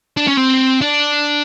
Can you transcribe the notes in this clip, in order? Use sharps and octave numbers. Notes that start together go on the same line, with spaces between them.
D4
C#4
C4
D4